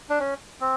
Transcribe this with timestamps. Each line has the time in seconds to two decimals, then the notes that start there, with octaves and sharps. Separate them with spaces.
0.10 D4
0.19 C#4
0.61 C4